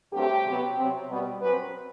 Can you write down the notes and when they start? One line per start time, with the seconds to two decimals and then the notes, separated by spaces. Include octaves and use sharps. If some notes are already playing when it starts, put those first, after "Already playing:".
0.13 G2 F#3 A3 C4 G4
0.45 C3 F#3 B3
0.76 C3 F#3 C4
1.08 B2 G3 B3
1.40 F#2 F#3 C4 B4